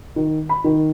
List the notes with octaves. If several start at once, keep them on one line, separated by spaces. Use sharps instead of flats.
D#3
B5
D#3